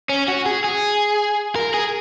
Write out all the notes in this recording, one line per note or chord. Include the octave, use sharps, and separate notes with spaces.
C#4
F#4
G#4
G#4
A#4
G#4